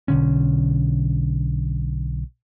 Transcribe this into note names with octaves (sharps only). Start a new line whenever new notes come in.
B1 D3 C#4